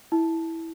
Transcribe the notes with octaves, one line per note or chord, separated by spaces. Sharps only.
E4